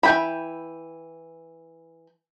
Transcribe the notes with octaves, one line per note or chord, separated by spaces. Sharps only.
E3 G5 B5